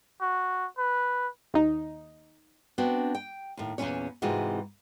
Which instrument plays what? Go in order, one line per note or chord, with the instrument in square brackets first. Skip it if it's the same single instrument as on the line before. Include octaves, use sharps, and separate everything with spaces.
[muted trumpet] F#4
B4
[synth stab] D#2 D#4
[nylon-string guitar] B3 C4 D4 F#4
G5
D#2 A2
E2 A#2 C#3 F#3 C#4 C#5
G#2 C3 E3 G#3 F4 F#4